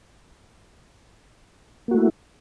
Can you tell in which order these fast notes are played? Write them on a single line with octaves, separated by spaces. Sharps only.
A#3 F#4 A3 E4